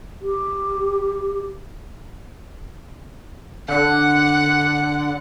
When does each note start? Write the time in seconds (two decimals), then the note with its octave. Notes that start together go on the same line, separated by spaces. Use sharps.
0.22 G4
3.68 D3 F#5